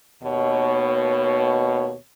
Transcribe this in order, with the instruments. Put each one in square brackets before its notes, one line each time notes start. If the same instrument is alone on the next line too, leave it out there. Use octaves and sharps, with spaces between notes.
[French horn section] D#2 B2 C#5